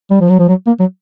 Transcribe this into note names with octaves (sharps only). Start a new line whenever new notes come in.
G3
F3
F#3
F3
F#3
A#3
F#3